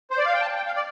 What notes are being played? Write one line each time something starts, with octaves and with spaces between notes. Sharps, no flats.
C5
D5
F5
G5
A5
G5
F5
D5